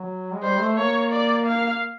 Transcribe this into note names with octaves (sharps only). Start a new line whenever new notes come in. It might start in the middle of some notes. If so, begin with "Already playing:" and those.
Already playing: F#3
G#3
G3 C5
A3
A#3 C#5
D5
F5